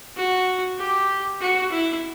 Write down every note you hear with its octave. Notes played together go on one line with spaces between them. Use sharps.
F#4
G4
F#4
E4